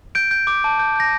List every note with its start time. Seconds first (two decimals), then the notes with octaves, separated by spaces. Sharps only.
0.15 G6 D7
0.31 G6
0.47 D6
0.64 A5
0.79 G6
0.96 G6 A#6